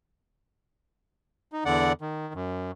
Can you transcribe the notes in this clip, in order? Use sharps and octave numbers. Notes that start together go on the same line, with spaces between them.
D#4
E2 D3 D5 F#5
D#3
F#2